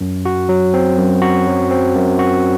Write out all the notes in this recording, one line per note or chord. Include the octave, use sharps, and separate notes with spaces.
F#2
F#4
F#3
C4
F#2
F#4
F#3
C4
F#2
F#4